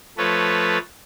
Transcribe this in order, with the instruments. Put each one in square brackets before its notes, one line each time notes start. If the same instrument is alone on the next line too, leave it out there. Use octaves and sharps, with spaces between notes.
[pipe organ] F3 A3 A4 B4 C#5